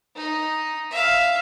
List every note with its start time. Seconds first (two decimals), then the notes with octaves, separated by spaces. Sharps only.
0.16 D#4
0.91 E5 F5